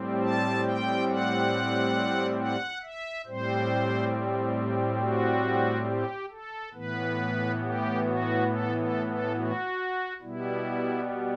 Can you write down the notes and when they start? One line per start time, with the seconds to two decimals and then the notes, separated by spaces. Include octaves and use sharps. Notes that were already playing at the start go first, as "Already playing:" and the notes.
Already playing: A2 G3 C4
0.22 A5
0.65 G5
1.09 F#5
2.39 F#5
2.82 E5
3.26 A2 G3 C4 C5
5.00 F#4
5.86 G4
6.30 A4
6.74 A2 E3 B3 B4
7.61 G4
8.05 F#4
8.47 A4
8.77 A4
9.06 A4
9.35 F#4
10.22 B2 G3 B3 E4